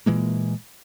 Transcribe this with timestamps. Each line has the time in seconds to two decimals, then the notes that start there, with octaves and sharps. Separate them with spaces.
0.06 A#2 E3 G#3 A#3